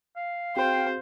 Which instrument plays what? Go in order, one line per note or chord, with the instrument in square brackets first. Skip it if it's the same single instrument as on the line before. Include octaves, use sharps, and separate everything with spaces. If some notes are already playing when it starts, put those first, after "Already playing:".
[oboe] F5
[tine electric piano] C4 F#4 G#4 [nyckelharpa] C5 [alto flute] G5